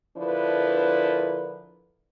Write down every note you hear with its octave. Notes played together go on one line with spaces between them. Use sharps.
D3 F3 D4 E4 A#4 B4